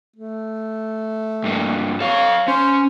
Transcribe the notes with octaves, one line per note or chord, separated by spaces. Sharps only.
A3
G2 A#3
A4 C#5 F5
C#4 C5